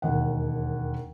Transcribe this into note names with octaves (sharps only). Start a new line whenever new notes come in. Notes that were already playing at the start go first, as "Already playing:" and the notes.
E1 D#2 F#5